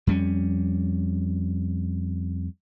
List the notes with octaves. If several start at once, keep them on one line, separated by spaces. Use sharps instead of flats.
F2 G3 C#4